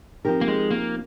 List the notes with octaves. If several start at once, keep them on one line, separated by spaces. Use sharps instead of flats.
F3 C4 D#4 G4 A#4
A#3
G#3
A#3